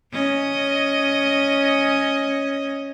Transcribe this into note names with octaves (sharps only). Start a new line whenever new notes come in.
C#4 D#5